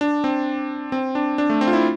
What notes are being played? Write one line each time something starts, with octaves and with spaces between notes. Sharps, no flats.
D4
C4
C4
D4
D4
A3
C4
F4
E4